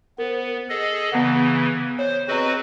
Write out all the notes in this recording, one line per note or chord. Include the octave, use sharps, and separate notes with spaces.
B3 A#4 C5
G#4 A4 D#5
C#3 E3 B3 F#5
C5 C#5
C4 F#4 G#4 B4 D#5 A#5